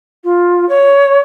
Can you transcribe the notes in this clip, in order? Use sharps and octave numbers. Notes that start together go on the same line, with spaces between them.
F4
C#5